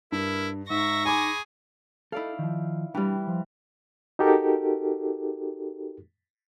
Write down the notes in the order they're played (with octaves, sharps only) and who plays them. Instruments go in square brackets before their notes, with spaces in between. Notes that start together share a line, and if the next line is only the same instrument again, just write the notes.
[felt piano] G2 [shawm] E4 [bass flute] A#4
[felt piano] G#2 [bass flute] D#4 [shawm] E5 [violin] C#6 A#6
[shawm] G#4 [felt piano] G#5 B5 D6
[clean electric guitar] D#4 A4 [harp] E4 D5 F5
[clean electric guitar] D#3 F3
[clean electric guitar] B1 D4 G5 [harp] E3 G3
[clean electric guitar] F3
[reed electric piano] D#4 F#4 G4 A4 A#4